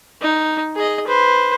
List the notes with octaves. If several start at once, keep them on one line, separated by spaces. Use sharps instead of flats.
D#4
G#4 D#5
B4 C5